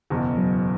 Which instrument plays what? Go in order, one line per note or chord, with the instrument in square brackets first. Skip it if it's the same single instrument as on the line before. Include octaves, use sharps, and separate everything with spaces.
[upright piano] F#1 E2 B2
[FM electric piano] F#3